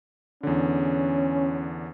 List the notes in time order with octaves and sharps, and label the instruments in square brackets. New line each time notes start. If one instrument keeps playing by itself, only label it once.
[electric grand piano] E2 D3 [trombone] C#4